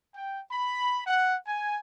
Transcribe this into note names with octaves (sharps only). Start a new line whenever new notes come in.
G5
B5
F#5
G#5